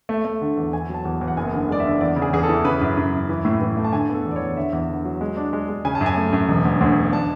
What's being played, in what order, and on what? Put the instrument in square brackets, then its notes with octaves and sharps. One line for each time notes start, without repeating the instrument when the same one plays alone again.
[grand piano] A3
A3
D3
E2
E2 G#5
F#3 A5
E2
E2
F#5
F#1 G#5
D3
G#3 D5
E5
D3
E2 D5
C#3
G#4
E2 G#4
A4
E3
C#3 B4
F#2
F#2
F#2
E3
A2
E3
A3
A5
D3 G#5
B3
A4
E2
D5
E2 C#5
D3 E5
E2
D3
F#3
G#3
D4
G#3
G#3
C#3 G#5
A5
F#2
G#5
A3
F#2
E1
D2
D2
E1
D4 A5